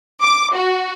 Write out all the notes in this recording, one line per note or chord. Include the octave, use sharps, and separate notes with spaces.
D6
F#4